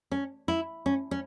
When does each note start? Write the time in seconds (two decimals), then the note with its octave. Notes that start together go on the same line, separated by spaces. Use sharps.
0.11 C#4
0.48 E4
0.86 C#4
1.11 C#4